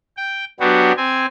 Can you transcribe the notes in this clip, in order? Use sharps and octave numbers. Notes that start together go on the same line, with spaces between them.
G5
F#3 B3 D4 F#4 G4
C4 G#5